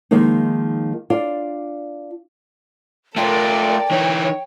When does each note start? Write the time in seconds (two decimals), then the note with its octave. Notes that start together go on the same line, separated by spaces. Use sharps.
0.11 D#3 F3 G#3 A#3 D#4
1.10 D4 F4 D5
3.16 A3 F4 A4 A#4 D5 G5
3.91 E3 D#4 C#5